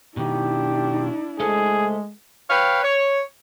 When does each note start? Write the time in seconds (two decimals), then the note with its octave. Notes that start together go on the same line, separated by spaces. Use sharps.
0.17 B2 D#3 D4 E4 G4
1.40 G#3 A3 G#4 A4 C5
2.50 B4 C#5 F5 G5
2.83 C#5